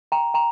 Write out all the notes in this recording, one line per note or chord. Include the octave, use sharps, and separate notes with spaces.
G5 A#5
G5 A#5